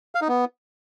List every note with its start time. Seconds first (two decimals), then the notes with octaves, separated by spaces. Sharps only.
0.15 F5
0.21 D#4
0.28 B3